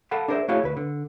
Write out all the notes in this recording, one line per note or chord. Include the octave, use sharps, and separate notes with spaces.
A4 F5 F#5 A5 B5
D4 G#4 A#4 C5 C#5 E5
A3 E4 F#4 G#4 C#5 F5
D2 B4
D3